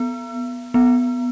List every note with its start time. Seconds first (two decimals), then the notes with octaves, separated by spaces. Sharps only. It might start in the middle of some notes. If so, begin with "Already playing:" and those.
Already playing: B3
0.74 B3